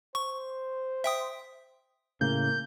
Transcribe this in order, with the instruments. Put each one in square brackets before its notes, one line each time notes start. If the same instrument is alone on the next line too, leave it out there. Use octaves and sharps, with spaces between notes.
[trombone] C5 [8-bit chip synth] C#6
[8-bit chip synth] E5 G5 D#6
[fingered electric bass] A2 C#3 [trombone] A#3 [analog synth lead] G6